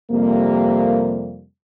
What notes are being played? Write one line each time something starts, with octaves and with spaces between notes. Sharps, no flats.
F2 C3 G3 A#3